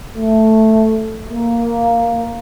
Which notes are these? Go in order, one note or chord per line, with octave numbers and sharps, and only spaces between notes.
A3
A#3